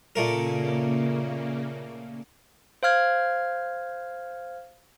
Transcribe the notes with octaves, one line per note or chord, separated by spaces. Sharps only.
A#2 C#3 A3 A#3 A#4
C5 F5 F6 G#6